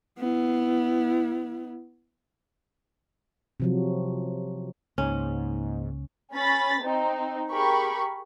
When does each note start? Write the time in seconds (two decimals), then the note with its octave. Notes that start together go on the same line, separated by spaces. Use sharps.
0.19 B3 E4
3.60 C3 F3 F#3
4.98 C#2 G#2 A#3 C#4 D#4
6.33 C#4 B5 A6 B6
6.83 C4 D#4
7.51 G4 G#4 A#4 B5 C#6